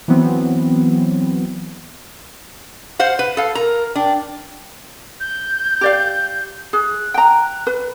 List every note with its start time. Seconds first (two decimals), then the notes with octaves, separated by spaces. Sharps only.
0.08 E3 F#3 B3 C4
2.99 C5 F5 F#5
3.19 B4
3.37 A4 F5
3.55 A#4 A#5
3.96 D4 G5
5.20 G6
5.81 G4 D5 F5
6.73 G#4 F#6
7.14 G5 A#5
7.67 B4